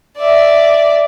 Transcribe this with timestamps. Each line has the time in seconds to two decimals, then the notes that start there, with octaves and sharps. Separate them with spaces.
0.18 D5 E5